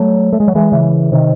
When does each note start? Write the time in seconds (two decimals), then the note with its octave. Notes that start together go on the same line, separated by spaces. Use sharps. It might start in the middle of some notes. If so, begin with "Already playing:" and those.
Already playing: F#3 A3
0.33 A3
0.40 G#3
0.48 F#3
0.55 E3 G#3
0.72 C#3 E3
1.12 C3 D#3